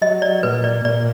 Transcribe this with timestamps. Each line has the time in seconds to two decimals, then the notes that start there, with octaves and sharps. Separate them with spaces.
0.01 F#3 D#5
0.22 D5
0.43 A#2 B4
0.64 D5
0.85 A#2 D5